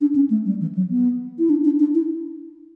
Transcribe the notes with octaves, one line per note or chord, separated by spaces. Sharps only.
D4
C#4
A3
G3
E3
F#3
B3
E4
D4
D4
D4
E4